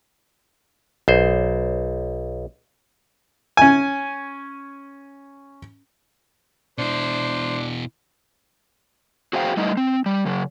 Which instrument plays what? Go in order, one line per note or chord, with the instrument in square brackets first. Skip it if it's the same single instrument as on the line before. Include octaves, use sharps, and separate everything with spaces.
[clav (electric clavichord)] B1 C5
[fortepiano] C#4 G#5
[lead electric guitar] B2 E4 [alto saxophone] D4 [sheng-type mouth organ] C5
[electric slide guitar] F#4 G#4 C5 F5 G5
G3 A3 D#4 E4 D#5
C4
G3
C#3 F#3